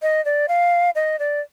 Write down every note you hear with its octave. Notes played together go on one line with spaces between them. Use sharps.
D#5
D5
F5
D#5
D5